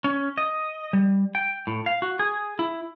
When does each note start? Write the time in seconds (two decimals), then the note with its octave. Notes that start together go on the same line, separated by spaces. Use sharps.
0.04 C#4
0.38 D#5
0.93 G3
1.35 G5
1.67 A2
1.86 F5
2.02 F#4
2.19 G#4
2.59 E4